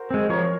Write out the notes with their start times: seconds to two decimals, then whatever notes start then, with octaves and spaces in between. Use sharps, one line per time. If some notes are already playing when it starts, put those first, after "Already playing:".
Already playing: F#4 A#4 C5
0.11 G#3 C4
0.29 F3 A#4 C#5